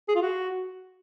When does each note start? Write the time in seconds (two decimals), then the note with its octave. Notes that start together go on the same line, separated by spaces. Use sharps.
0.09 G#4
0.15 F4
0.22 F#4